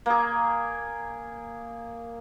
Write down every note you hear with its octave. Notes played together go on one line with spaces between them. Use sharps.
A#3 G#4